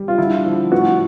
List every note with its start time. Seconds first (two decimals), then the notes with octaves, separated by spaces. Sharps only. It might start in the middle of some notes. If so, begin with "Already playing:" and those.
Already playing: G3
0.08 F4
0.18 D3 E4
0.45 F3
0.72 A2 F#4